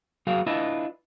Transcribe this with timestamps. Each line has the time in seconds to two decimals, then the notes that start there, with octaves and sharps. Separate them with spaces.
0.27 F#3 F#4 G#4 A#4 F5
0.46 D4 E4 F4 B4 D#5 E5